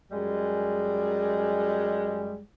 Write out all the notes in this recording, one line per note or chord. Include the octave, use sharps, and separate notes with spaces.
F#2 G3 G#3